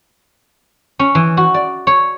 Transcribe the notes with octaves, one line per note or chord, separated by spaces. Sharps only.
C#4
E3
F#4
D5
C#5